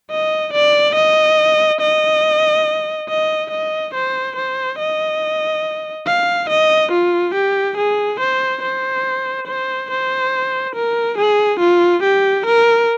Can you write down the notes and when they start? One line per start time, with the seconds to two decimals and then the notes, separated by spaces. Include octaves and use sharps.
0.11 D#5
0.53 D5
0.95 D#5
1.80 D#5
3.09 D#5
3.50 D#5
3.94 C5
4.36 C5
4.78 D#5
6.07 F5
6.49 D#5
6.92 F4
7.34 G4
7.77 G#4
8.20 C5
8.63 C5
9.47 C5
9.90 C5
10.75 A#4
11.18 G#4
11.60 F4
12.03 G4
12.46 A#4